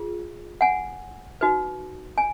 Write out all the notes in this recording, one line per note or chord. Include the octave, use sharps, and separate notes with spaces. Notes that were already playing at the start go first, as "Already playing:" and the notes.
Already playing: F4 G#4
F#5 G#5
D#4 F#4 B4
G#5